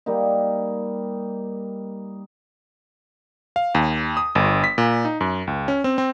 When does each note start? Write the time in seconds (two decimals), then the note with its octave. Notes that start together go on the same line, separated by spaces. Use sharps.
0.06 G3 A#3 D#4
3.56 F5
3.75 D#2
4.17 D#6
4.35 G1
4.64 B6
4.78 A#2
5.05 D#4
5.21 F#2
5.47 C#2
5.68 C#4
5.84 C4
5.98 C4